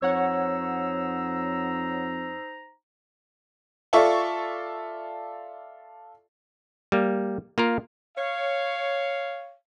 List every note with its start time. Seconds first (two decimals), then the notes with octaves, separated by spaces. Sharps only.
0.02 F2 D#4 C5 C#5 F#5 A#5 E6
3.93 F4 A4 D5 E5 C#6
6.92 G3 A#3
7.58 A#3 F4 A#4
8.16 C#5 F5